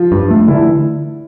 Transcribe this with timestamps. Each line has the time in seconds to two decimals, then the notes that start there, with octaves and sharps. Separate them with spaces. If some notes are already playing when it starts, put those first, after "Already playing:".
Already playing: F3 F4
0.12 G2
0.30 A3
0.48 D3 E3 E4